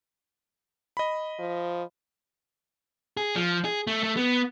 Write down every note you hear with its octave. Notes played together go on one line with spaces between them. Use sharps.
D#5 B5
F3
G#4
F3
G#4
A3
A3
B3